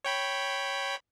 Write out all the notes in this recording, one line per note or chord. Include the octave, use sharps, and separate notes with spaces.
C#5 G5 B5